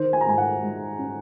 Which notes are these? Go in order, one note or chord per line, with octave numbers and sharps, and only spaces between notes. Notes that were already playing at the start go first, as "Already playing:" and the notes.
Already playing: D#3 C5
G#5
A#5
G#2 G#5
F#5
G#3
C#4